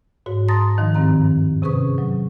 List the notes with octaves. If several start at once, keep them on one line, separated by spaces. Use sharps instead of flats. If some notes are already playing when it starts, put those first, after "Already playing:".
G#2 F#4 C#5
A5 A#5 C6 D#6 A6 A#6
D#3 F3 D#4
E2 G2 D#3 C4 A#5
C3 C#4 G#4 B4 C#6 D#6
F#3